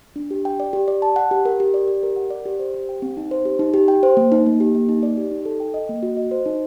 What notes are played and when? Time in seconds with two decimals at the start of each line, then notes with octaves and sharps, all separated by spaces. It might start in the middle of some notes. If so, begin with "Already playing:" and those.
0.16 D4
0.31 G4
0.45 G5
0.60 D5
0.73 G4
0.88 D5
1.02 A5
1.16 F#5
1.31 G4
1.45 A#4
1.60 G4
1.74 D5
1.88 G4
2.03 A#4
2.16 F#5
2.30 D5
2.45 G4
2.59 C5
2.74 G4
2.89 G5
3.02 C4
3.17 D#4
3.31 C5
3.45 G4
3.59 D#4
3.74 G4
3.88 G5
4.03 C5
4.17 A#3
4.32 D#4
4.46 A#3
4.60 G4
4.75 A#3
4.89 D#4
5.03 D5
5.17 G4
5.31 D#4
5.45 A4
5.60 G5
5.74 D#5
5.89 A#3
6.03 F#4
6.17 D#5
6.31 C5
6.46 D#4